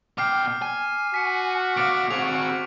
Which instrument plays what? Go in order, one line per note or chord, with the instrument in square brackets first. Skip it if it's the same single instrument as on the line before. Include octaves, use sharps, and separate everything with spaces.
[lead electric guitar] B2 G5 [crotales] D6 F6 C7
[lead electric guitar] G#5
[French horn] F#4 [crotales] B6 C#7
[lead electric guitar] B2 F5 [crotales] D6 D7
[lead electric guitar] C4 G#4 [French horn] F#4 [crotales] C#6 F7